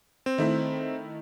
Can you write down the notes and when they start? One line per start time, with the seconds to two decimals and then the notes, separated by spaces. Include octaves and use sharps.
0.26 C4
0.38 D#3 A3 E4